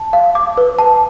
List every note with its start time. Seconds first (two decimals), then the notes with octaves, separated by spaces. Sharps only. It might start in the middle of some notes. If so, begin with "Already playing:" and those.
Already playing: A5
0.13 F5
0.35 D6
0.58 B4
0.79 A5